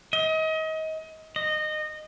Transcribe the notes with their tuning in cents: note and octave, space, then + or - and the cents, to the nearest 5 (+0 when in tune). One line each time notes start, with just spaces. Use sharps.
D#5 +30
D#5 -20